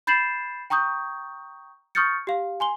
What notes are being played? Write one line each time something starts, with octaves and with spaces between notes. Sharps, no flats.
B5 G6 A6 C7 E7 F#7
G5 A#5 C#6 D#6 G6
C#6 D#6 F6 G6 A6 C#7
G4 F5
G#5 C6 G7